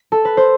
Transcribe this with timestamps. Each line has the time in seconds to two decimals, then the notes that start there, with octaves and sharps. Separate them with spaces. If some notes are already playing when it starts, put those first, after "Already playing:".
Already playing: G4
0.12 A4
0.25 B4
0.37 C5